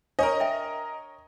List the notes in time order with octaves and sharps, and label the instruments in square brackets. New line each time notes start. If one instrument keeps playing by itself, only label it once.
[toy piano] D4 [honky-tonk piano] A#4 D#5 [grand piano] C#5
[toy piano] E5 G5